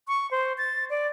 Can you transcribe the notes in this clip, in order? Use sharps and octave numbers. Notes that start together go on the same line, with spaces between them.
C#6
C5
A6
D5